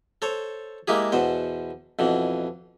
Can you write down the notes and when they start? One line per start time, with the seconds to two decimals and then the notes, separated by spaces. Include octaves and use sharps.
0.22 A4 C5 C#5
0.88 G#3 A#3 E4 G4 G#4
1.12 E2 B2 C5
1.99 F2 B2 E3